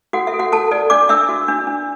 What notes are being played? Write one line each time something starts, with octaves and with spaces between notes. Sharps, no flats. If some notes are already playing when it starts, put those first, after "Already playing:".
F#4 A4 F#5
E5
A4
F#4 F#5
A4 A5
A4 D5
D4 D5 D6
D4 E5 E6
F#4
D4
D4